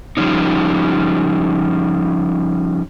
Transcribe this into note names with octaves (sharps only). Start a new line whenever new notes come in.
F3 G3 C#4 D#4